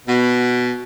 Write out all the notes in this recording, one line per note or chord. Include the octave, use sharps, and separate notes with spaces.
B2